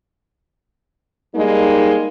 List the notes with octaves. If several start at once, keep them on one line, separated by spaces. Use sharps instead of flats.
G3 G#3 A#3 D#4